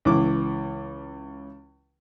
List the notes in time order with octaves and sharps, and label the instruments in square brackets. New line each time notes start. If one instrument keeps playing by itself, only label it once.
[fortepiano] C#2 E3 D6